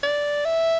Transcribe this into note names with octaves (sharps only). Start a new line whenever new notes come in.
D5
E5